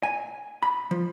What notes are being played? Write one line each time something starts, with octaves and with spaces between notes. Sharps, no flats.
G#5
B5
F3